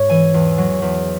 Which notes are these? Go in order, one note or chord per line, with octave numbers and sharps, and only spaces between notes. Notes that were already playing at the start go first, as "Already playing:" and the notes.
Already playing: G#2 C#5
E3 G#5
E2
F#3
E2